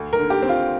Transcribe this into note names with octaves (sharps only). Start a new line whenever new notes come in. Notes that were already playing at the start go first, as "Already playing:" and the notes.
Already playing: D2
A#4
D3
G4
C4
F4